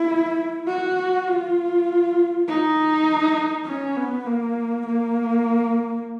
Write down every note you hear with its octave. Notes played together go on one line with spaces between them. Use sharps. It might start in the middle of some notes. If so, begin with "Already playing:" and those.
Already playing: E4
F#4
F4
D#4
C#4
B3
A#3
A#3